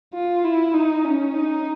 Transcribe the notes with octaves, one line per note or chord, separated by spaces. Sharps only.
F4
E4
D#4
C#4
D#4